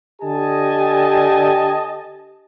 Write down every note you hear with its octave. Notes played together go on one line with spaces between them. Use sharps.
D3 G4 D#5 G#5 A5